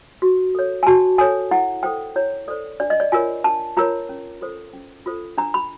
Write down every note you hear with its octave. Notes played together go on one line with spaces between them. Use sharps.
F#4
A4 C#5
G#5
F#4 A5
A4 C#5 G#5
E4 F#5
A4 C5 G5
E4 C#5
A4 C5 D5
D4 D5
D#5
D5
F4 A#4 C#5 G#5
D4 A5
F4 A#4 C#5 A#5
C#4
F4 A4 C5
C#4
F4 A4 C5
D4 A#5
B5